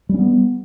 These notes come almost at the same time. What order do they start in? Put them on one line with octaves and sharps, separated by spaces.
G3 C#4 B3